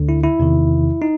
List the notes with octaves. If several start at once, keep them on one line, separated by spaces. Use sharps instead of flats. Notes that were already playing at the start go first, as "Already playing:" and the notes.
Already playing: D2 D3
E4
E4
E2 C3 D#3
D#4